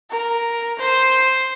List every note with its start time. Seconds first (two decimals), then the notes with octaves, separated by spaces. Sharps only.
0.12 A#4
0.79 C5